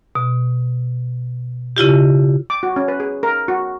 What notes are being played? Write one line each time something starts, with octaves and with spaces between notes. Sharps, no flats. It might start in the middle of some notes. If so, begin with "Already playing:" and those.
B2
C#3 E4 F4 G4
D6
F#4
C#4
B4
G#4
A#4
F#4